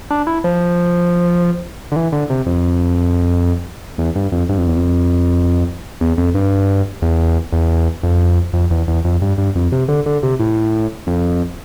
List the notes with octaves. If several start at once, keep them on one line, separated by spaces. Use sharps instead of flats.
D4
E4
F3
D3
E3
D3
C3
F2
E2
G2
F2
G2
F2
E2
F2
E2
F2
G2
E2
E2
F2
F2
E2
E2
F2
G2
G2
F2
C3
D3
D3
C3
A2
F2